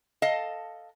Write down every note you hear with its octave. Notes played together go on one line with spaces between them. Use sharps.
A4 D#5 F5 A5